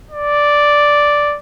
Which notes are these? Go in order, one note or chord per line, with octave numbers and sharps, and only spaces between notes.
D5